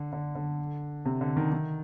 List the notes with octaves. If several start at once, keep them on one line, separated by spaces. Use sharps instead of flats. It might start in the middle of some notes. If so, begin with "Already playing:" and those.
Already playing: D3
D3
D3
C3
D3
D#3
D#3